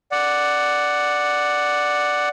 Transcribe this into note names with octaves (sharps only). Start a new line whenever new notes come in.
D5 F#5